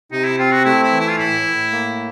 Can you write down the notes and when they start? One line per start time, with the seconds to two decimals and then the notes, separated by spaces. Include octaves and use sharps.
0.11 C3 D#4
0.24 E4
0.38 C4 F4
0.51 F#4
0.65 A3 E4
0.83 E4
0.92 E3
1.00 E4
1.10 F4
1.18 A2 E4
1.45 A2
1.72 A#3